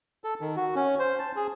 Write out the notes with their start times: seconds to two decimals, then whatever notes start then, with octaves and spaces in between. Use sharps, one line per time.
0.24 A4
0.41 D#3
0.56 F#4
0.76 C#4
0.99 C5
1.19 A5
1.36 G#4